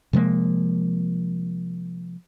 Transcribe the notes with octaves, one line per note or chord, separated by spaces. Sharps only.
C3 F3 G#3 A#3